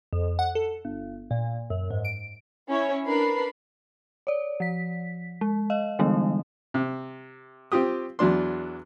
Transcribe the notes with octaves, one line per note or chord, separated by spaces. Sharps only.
F2
F#5
A4
G1
A#2
F#2
G#2
D7
C#4 E4 C#5
D4 A#4 B4 B5 C7
C#5 D5
F3 B6
G#3
D#5 F5
D3 E3 G3 G#3 B3 D4
C3
C4 F4 G4 D#6
E2 F#3 D4 C6